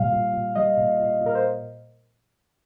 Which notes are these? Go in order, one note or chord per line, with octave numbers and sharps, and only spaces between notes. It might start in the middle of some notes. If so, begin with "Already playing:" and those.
Already playing: A#2 G3 F5
A#2
A#2
G3 D#5
A#2
A#2
A#2
A#4
C5